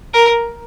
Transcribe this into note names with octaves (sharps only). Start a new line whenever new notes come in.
A#4